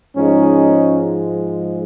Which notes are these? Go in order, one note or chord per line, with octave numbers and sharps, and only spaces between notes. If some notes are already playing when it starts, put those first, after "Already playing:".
G#2 F3 G#3 C#4 D#4